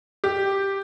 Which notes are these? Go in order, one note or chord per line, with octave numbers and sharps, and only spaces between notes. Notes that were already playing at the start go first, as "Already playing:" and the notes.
G4